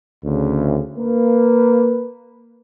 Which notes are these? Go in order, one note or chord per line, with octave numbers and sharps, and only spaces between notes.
D2 C#3
A#3 B4